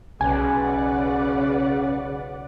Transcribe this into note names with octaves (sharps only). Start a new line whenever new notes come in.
B1 C#3 B4 D5 F#5 G#5